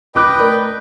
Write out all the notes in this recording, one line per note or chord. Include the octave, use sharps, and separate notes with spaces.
B4 D#5 G5 B5 D6 F#6
A3 A#4 D5